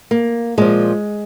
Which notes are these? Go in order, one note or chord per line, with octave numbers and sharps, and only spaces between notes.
A#3
A#2 F3 G#3